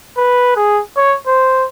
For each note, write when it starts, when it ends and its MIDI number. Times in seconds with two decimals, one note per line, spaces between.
0.17 0.55 71
0.56 0.81 68
0.97 1.15 73
1.27 1.64 72